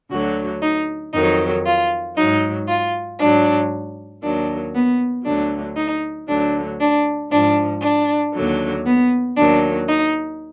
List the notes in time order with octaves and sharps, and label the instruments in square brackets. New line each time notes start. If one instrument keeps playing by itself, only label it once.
[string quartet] D2 D3 F#3 F#4
D#4
F2 D#3 F#3 D#4
F4
G#2 F#3 D#4
F4
G#2 F#3 D4
D#2 D#3 F#3 D4
B3
D2 D3 F#3 D4
D#4
D2 D3 F#3 D4
D4
G#2 F3 D4
D4
D#2 D3 F#3
B3
D#2 D#3 F#3 D4
D#4